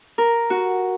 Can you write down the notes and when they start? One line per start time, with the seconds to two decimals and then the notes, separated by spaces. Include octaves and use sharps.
0.18 A#4
0.50 F#4